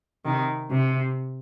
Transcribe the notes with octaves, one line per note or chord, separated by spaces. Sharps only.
C3 D#3
C3